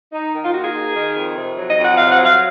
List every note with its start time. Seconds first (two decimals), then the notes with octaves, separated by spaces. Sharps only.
0.12 D#4
0.33 D#3
0.43 F4
0.53 A#3 F#4
0.64 G#4
0.74 D#4
0.94 D#3
1.15 F2
1.36 C3
1.56 F#3
1.70 D#5
1.77 F2
1.84 F#5
1.97 C3 F5
2.11 F#5
2.18 F#3
2.25 F5